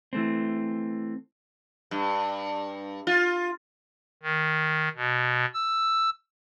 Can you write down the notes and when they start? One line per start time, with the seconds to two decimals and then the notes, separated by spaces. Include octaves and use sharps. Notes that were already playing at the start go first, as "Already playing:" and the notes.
0.13 E3 A3 C4
1.91 G2
3.07 F4
4.23 D#3
4.96 B2
5.54 E6